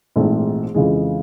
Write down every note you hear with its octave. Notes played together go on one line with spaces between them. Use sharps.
A#1 G#2 E3 A3 C4
F2 C#3 E3 G#3